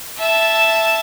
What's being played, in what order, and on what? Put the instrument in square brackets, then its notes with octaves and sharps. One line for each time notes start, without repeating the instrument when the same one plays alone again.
[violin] E5 A5